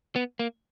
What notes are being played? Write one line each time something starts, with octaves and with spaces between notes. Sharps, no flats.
B3
A#3